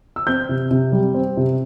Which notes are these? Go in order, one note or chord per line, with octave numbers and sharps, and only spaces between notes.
E6
C4 G6
C3
C3
G3
C4
C3